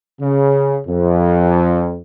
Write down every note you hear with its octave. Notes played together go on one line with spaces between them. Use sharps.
C#3
F2